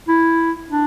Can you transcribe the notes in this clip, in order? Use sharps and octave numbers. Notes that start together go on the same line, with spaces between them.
E4
D4